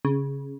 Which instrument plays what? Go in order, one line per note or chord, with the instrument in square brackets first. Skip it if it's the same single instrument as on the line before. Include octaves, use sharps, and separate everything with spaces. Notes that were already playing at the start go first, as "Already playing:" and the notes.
[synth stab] C#3